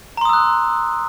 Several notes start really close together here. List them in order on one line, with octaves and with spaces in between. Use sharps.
A#5 C6 D#6 E6 F#6